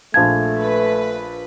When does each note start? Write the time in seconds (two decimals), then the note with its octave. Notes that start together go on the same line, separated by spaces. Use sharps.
0.14 A#1 A3 F5 A5 G#6
0.59 B4